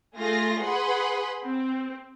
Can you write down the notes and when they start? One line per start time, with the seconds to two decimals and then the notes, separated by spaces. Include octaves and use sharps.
0.16 A3 F4 G#4 A#6
0.63 G#4 B4 F#5 B5 C6
1.45 C4